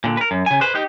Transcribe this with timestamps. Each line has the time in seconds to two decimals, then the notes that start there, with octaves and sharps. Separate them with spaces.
0.04 A#2 D3
0.17 A#4 B4
0.31 F#2
0.46 C#3 G#5
0.61 B4 C5
0.75 D#4 G4